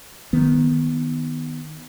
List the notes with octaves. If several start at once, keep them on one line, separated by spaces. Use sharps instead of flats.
D#3 B3